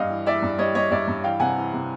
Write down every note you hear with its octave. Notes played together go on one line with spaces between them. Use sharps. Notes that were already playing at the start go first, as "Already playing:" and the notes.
Already playing: G2 D#5 F5
E3
E3 D5 E5
G2
G3 C#5 D#5
G3 C#5 D#5
G2 D5 E5
G2
E3 F5 G5
C3 F#5 G#5
E3
C3